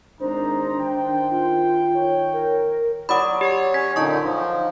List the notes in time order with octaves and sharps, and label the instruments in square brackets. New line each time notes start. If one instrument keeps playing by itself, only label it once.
[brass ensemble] G#1 D#4 A#5 [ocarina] D4 [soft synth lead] C5
[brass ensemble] D#3 G5
[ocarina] F4
[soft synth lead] C#5
[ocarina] A#4
[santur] F#3 D5 [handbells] B5 D#6
[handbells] G4 [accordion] C#5
[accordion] C#4 [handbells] G#6 B6
[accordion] A#2 D3 [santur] D#4 [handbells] A5 C#6
[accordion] F3